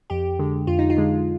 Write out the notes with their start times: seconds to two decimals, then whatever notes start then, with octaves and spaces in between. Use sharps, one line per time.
0.10 F2 G4
0.39 D3 G#3
0.67 F2 F4
0.79 D#4
0.90 F4
0.97 D3 G#3